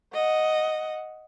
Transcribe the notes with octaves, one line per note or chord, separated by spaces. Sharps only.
D#5 F#5